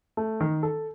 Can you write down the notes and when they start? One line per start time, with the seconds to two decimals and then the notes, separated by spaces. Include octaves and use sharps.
0.17 A3
0.40 D#3
0.63 A4